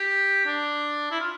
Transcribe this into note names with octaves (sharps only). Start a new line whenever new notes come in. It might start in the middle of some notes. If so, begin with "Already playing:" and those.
Already playing: G4
D4
E4
F4